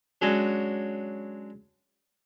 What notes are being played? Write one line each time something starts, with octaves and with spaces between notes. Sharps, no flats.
F#3 G#3 C#4 D4